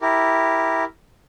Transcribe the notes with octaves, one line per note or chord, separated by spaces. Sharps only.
E4 G4 A#4